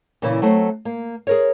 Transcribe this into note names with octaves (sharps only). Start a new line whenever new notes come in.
A#2 C#3 E3 E4
F#3 A3 C4
A#3
G#4 A#4 C#5